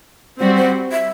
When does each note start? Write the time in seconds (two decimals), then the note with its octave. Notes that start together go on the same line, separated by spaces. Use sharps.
0.39 G3 C4 F#4 C5
0.56 C5
0.92 E5